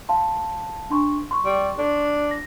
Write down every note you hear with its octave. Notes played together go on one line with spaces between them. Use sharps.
F5 A5 C6
D4 C6 C#6
C6 C#6
G3
D4
A#6